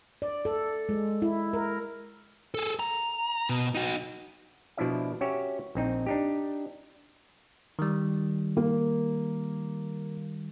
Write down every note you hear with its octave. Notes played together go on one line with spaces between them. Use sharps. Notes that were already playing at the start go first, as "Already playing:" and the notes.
D5
A4
G#3
E4
A#4
G#4 A4
A#5
B2
D#4 F#4
B2 F3 D4 E4 D5 E5
C#4 F#4 G4 C#5 E5
A#1 C4 D#4
D4 D#4 G4
D#3 G3
A#3